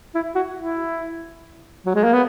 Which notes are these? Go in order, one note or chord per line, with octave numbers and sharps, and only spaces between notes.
E4
F#4
E4
F#3
G#3
A#3
B3